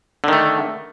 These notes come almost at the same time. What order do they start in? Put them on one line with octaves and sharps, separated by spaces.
D3 D#3 A3